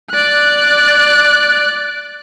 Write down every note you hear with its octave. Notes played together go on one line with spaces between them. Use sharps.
D5 F#6